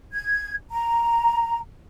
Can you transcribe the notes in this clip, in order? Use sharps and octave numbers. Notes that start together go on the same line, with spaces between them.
G#6
A#5